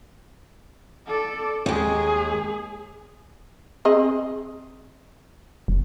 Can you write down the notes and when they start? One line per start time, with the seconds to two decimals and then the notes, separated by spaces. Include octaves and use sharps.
1.07 A4 D5
1.66 D#2 G#3 G#4
3.85 C4 G#4 D#5
5.68 F1